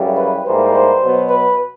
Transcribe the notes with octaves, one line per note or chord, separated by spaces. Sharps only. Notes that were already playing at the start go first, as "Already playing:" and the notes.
Already playing: F#2 C#3 E3 G3
B4
G#2 E3 G3 A#3 C5
C5
B2 F#3 B3
B4